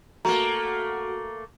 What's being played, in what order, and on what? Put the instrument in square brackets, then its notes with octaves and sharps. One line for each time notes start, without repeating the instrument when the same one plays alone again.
[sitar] A3 A#3 [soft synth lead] F#4 [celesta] A#5